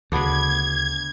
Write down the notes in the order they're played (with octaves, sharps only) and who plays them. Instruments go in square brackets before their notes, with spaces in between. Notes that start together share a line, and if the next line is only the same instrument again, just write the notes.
[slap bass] D2 C#3 [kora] B3 D4 [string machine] G#6